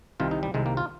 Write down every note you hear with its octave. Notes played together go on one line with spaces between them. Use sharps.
C2 C3 D#3 F4
D#4
G3
C2 C3 D#3 G#3
A#3
F4